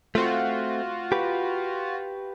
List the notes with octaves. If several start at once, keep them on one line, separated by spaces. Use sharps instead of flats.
A3 C4 F4 F#4
G4 B4